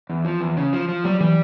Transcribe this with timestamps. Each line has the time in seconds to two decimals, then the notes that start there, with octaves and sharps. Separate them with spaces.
0.10 E2
0.25 F3
0.41 E2
0.57 C#3
0.73 F3
0.89 F3
1.04 F#3 G3
1.21 E3 G3